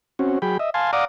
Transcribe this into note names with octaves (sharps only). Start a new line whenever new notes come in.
C4 C#4 F#4
F#3 G#4 G5 B5
D#5 E5
F5 G#5 A5 C6
D5 F5 F#5 A#5 D6 D#6